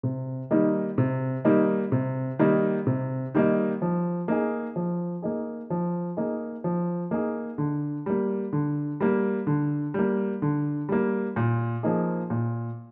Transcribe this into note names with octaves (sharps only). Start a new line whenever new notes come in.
C3
D#3 G3 A#3 D#4
C3
D#3 G3 A#3 D#4
C3
D#3 G3 A#3 D#4
C3
D#3 G3 A#3 D#4
F3
A#3 D#4 G#4
F3
A#3 D#4 G#4
F3
A#3 D#4 G#4
F3
A#3 D#4 G#4
D3
G3 A#3
D3
G3 A#3
D3
G3 A#3
D3
G3 A#3
A#2
F3 A#3 D#4 G#4
A#2